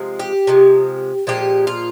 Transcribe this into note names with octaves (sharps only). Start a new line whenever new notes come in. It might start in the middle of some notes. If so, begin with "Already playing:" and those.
Already playing: C3 F3 G#3
G4
C3 F3 G#3
A#2 F3 G#3 G4
F4